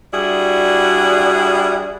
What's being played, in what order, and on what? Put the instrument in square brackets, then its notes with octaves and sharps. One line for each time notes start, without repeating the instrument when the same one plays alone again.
[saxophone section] G3 D4 E4 F#4 G#4